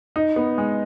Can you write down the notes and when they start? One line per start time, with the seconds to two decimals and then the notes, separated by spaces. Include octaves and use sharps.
0.16 D#4
0.36 B3
0.58 G#3